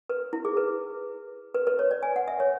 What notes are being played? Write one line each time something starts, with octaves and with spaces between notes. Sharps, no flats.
B4
E4
G#4
B4
B4
B4
C#5
D5
G#5
F#5
E5
C#5